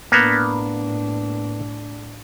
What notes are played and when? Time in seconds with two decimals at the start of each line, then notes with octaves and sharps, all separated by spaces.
0.12 A2 A#3 B3 D4